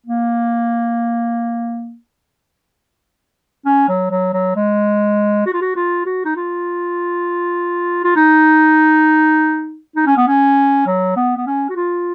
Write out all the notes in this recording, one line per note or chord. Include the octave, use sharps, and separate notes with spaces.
A#3
C#4
F#3
F#3
F#3
G#3
F#4
F4
F#4
F4
F#4
D#4
F4
F4
D#4
D#4
C#4
B3
C#4
F#3
B3
B3
C#4
F#4
F4